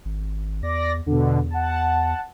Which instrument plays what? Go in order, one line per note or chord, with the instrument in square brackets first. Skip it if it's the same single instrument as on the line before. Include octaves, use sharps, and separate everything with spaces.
[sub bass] G#1
[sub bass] E2 [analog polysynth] D5 A#6
[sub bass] E2 [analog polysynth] B2 D3
[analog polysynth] F#5 A5